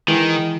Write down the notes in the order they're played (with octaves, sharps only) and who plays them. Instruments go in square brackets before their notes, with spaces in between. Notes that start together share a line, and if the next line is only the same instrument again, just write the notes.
[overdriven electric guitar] D#3 [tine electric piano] E3 G#3